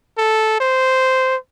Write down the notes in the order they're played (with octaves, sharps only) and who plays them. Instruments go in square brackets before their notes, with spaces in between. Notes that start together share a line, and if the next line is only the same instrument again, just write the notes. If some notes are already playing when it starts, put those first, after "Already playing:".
[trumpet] A4
C5